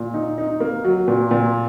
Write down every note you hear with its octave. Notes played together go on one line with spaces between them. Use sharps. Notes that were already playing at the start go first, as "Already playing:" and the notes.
Already playing: A#2
D#4
D#4
A#3
F#3
A#2
A#2